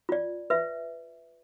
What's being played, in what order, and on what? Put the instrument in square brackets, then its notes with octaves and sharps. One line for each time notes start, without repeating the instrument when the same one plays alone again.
[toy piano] F4 D5
B4 E5